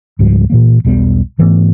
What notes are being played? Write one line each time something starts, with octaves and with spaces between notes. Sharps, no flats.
C#2 G#2 F3 G3
A#2 E3 A#3
E1 B1 G3 B3
G#2 E3 A3 B3